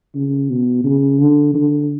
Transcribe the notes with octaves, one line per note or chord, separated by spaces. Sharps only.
C#3
B2
C#3
D3
D3